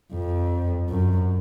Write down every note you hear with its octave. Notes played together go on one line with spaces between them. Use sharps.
F2
F#2